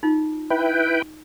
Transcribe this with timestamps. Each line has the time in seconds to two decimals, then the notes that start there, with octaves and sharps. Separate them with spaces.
0.03 D#4 F4
0.50 E4 B4 G5